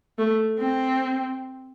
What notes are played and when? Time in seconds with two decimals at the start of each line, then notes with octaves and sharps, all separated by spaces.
0.18 A3
0.59 C4